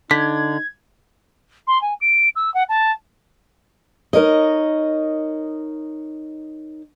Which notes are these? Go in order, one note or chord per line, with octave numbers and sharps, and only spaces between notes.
D3 D#4 G#6 B6
C6
G#5
D7
E6
F#5
A5
D#4 A#4 C#5 D#5